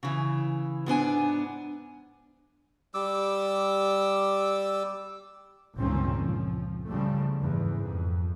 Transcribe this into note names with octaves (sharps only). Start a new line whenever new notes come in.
C#3 E3
G#2 B3 D4 G#5
G3 D6 E6
G1 C#2 A#2 D#3 C4 C#4
F3
C#3 F3 G3 A3
E2 G#2
F2